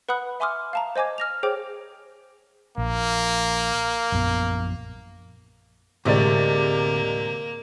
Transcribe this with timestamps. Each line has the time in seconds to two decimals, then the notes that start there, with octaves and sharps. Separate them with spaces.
0.09 B4 F#5 B5 D#6 F#6
0.40 E5 G#5 C6 D6 D#6 F6
0.73 F5 A5 A#5
0.96 C5 D#5 G#5 D6 G#6
1.18 F6 A#6 F7
1.43 G#4 C5 C#5 G5 D6
2.78 A#1 A#3
4.12 A#1 F#2 B3
6.05 D2 A2 C3 G#3 A#3 G4 D5